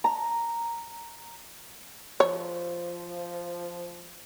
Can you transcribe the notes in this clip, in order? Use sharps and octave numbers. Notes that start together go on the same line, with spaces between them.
A#5
F3 C#5